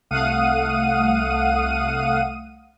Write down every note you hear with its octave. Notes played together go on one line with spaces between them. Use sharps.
C2 A3 F5 F#5 D#6 D#7